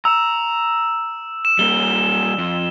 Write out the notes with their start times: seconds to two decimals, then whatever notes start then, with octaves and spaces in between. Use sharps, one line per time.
0.05 A#5 E6 E7
1.45 E7
1.59 G3 A#3 G7
2.38 F2